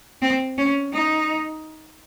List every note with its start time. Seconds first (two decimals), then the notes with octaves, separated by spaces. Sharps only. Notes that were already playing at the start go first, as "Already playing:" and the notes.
0.22 C4
0.58 C#4
0.93 D#4